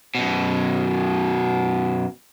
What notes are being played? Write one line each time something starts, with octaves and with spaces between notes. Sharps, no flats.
F#2 B2